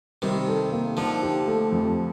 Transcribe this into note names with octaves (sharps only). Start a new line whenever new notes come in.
C3 D#3 G3
A4
A#3
D3 F3 D#4
G4
A3
F2